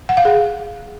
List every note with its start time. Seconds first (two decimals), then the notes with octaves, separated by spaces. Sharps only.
0.09 F#5
0.17 F5
0.25 G#4